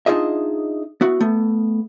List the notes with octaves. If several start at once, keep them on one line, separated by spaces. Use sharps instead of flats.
D4 D#4 F4 G#4 D#5 E5
B3 E4 F#4
A3 B3